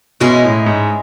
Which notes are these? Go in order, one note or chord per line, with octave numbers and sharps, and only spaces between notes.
B2 G#3 C#4 E4
A2
G#2